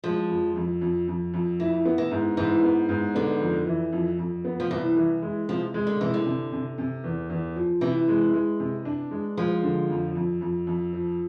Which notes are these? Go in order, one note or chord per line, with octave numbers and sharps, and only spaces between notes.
F3 G#3
F2
F2
F2
F2
F2
E3 E4
B3
E3
G#2
G#2 E3
B3
G#2
D3 B3
F2
E3
F2
F2
B3
F3
C2 E3
E3
G#3
C3 F3
G#3
D3
C3 E3
D3
C3
C3
C3
E2
E2
F3
C3 E3
G#3
G#3
C3
D4
G#3
F3 G#3
D3
F2
F2
F2
F2
F3